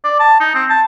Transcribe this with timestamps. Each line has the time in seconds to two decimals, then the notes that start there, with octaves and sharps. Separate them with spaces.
0.04 D5
0.20 A5
0.40 D#4
0.55 C4
0.70 A5